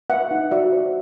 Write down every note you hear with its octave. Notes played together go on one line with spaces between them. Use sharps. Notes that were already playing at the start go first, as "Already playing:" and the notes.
B4 E5 F#5
D#4
F#4 D5 E5
C5